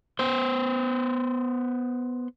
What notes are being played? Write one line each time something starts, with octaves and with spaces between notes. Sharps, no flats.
B3 C5